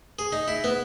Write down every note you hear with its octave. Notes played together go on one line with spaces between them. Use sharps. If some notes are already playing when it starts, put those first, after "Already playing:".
G#4
D#4
E4
B3